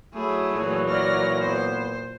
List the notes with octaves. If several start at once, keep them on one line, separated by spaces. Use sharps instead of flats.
F#3 A3 E4 G#4
A#2 E3 F#3
D5 F6 A#6
B3 C5